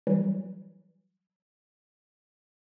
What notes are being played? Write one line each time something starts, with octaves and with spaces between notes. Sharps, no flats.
E3 F#3 G3